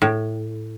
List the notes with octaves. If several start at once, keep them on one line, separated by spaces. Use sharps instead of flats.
A2